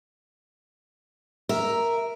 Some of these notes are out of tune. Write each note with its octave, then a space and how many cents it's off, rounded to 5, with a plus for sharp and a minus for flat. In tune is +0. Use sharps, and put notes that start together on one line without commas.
A#4 +0 E5 +0